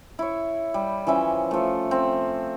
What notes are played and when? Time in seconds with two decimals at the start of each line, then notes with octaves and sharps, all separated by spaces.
0.19 E4 C#5
0.74 G3
1.07 E3 F3 C#4 E5
1.51 F3 A3
1.91 C4